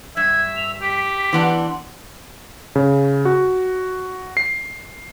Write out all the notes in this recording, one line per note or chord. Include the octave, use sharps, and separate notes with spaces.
G2 E5 G#6
F7
G4 B6
E3 B3 D4 C6
C#3
F#4
C7